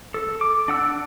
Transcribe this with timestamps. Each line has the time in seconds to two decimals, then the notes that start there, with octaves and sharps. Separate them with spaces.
0.14 A4
0.41 D6
0.68 D4 F#5 E6